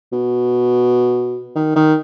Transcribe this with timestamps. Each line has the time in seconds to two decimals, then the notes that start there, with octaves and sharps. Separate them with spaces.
0.12 B2
1.56 D#3
1.76 D#3